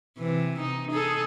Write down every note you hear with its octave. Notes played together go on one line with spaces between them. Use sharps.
C3 E3
D#4
D#4 G#4 A4